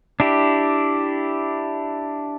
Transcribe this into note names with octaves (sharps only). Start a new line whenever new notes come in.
D4 E4 G4